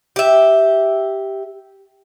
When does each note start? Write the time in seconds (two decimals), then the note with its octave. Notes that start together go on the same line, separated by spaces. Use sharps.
0.16 G4 E5